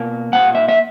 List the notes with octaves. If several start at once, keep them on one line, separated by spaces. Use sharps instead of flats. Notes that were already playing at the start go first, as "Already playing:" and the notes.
Already playing: B2 A#3
A#2 A#3 F#5
E5
E5